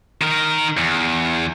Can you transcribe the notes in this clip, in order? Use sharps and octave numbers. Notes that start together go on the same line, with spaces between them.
D#3 A#4
E2